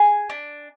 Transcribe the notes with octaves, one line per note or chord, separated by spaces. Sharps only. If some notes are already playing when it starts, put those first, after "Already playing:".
Already playing: G#4 G#5
D4